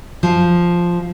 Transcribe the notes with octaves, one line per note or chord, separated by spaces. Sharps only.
F3